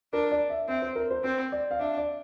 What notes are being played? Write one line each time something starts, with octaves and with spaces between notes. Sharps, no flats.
D4 A#4
D5
E5
C4 E5
C5
A#4
C5
C4 C5
D5
F5
D4 E5
D5